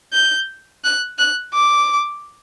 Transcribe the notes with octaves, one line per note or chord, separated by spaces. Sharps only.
G6
F#6
F#6
D6